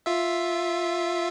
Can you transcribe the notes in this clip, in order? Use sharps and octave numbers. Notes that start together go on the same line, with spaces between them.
F4 E5